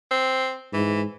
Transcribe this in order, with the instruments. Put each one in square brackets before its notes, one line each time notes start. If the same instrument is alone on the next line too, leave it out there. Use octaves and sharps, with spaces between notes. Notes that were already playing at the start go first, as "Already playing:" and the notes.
[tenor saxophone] C4
[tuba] G#2 [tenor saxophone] E3